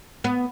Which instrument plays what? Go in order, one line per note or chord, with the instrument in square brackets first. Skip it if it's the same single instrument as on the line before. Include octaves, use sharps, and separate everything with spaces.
[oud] B3